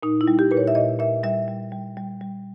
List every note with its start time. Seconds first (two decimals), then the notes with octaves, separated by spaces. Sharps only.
0.03 A#2 D#4
0.21 E4
0.27 G3
0.39 G4
0.51 A#2 B4
0.57 C#5
0.68 E5
0.75 A#2 D#5
0.99 A#2 E5
1.23 G3 E5
1.48 G3
1.72 G3
1.97 G3
2.21 G3